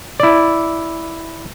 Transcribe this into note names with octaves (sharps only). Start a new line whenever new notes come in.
E4 D5